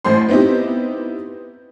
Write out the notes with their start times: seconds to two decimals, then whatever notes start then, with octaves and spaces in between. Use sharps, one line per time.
0.05 A1 A2 C5 C6
0.29 B3 C4 D#4 E4 G4